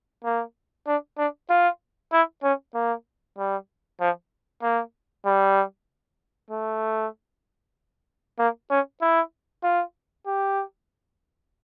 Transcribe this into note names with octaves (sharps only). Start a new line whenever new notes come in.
A#3
D4
D4
F4
E4
C#4
A#3
G3
F3
A#3
G3
A3
A#3
C#4
E4
F4
G4